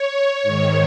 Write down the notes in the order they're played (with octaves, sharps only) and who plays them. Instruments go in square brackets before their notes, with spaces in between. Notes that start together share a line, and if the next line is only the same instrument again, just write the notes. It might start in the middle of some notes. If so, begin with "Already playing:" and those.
Already playing: [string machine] C#5
G#2 D#3